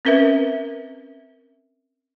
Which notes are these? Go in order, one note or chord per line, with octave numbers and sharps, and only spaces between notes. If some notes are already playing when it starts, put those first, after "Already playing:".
C4 C#4 A#4 B4 E5